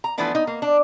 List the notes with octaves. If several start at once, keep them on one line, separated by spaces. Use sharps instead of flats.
A#5
E3 F3 A3 B3 D4 E4
D#4
A#3
D4